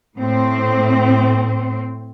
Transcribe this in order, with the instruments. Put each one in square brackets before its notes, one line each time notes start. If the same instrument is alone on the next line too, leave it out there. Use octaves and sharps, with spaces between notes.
[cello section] A2 C4